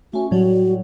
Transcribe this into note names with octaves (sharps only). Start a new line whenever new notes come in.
A3 C#4 F#4
A2 F#3 G3 F#4